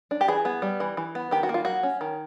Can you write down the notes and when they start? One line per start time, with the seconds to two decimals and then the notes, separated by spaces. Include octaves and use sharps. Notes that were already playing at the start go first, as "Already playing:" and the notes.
0.11 D4
0.21 G4
0.28 E3 G#4
0.45 B3
0.62 G3
0.80 E3
0.97 E3
1.15 B3
1.31 D#3 G4
1.43 F#4
1.49 A#3
1.54 F4
1.65 F#3 F#4
1.83 C#4
2.01 D#3